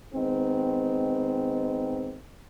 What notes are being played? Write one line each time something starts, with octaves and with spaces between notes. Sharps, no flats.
D#3 G#3 B3 C4